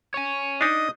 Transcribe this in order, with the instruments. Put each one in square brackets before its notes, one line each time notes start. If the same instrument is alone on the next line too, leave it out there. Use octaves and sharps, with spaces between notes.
[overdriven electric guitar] C#5 G#5
[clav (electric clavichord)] D4 D#4 [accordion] D#5